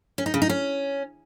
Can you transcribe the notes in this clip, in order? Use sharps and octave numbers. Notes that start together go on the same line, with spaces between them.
C#4
D#4
C#3
D#4
C#4